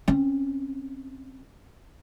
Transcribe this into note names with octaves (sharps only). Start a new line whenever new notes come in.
C4 C#4